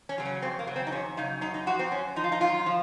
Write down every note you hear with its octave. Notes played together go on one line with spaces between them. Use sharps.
C#4
C#3 F#3
C#4
F2 C4
A#3
C#3 F#3
C4
D#4
F2 C#4
C#3 F#3 D#4
F#2 D#4
D#4
F3 F#4
C4
F#2 C#4
F3 D#4
F4
D#4
F#2 F4
F3